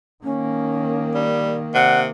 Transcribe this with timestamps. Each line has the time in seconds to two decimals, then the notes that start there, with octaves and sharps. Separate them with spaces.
0.24 D#3 A#3 C#4
1.15 G3
1.74 C3 D5 F#5